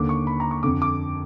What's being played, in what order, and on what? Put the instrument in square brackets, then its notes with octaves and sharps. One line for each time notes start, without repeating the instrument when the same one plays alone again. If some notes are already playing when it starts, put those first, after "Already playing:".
Already playing: [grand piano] D#2 D3 D6
C#6
B5
A#5
C#6
F2 D3 D6
D6